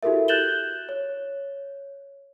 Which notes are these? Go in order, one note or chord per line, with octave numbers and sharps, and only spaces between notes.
E4 F#4 G4 A4 A#4 E5
F#6 G6 A6 E7 F#7 G7
C#5